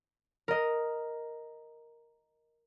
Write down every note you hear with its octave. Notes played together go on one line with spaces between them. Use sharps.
A#4 D#5